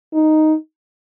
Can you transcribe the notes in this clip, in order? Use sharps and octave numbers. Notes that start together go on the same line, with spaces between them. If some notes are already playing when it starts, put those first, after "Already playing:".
D#4